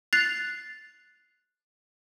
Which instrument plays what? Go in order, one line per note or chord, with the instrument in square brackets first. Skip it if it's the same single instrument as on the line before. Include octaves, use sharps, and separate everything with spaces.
[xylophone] F#6 A6 C7 F7